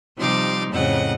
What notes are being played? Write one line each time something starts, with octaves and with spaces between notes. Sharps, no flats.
C3 F3 G3 D#4 C6 D6
F2 A2 C#3 D#5 F#5